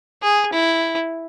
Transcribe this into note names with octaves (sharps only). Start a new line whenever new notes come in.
G#4
E4